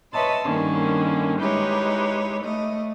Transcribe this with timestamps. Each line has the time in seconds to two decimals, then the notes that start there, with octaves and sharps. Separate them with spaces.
0.13 B4 C#5 D#5 E5 A5 C6
0.44 G2 D3 D#3 A#3 C#4
1.40 G#3 D#4 E4 G4 B4 C#5
2.43 A3 D#5